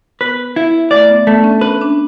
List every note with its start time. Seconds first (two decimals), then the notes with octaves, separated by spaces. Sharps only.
0.21 B3 B4
0.56 E4
0.91 A3 D5
1.10 B3
1.27 A3 B3
1.37 D4
1.44 C#4
1.61 C#4 B4
1.81 D4
1.90 C#4